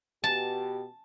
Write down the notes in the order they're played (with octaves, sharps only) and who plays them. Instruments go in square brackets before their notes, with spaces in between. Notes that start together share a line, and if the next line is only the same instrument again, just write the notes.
[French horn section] B2 G4 [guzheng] A5